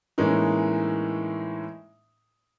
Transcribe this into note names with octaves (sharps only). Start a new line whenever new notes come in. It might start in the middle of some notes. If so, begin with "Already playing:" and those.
A2 E3 G#3 A#3 C#4 D#4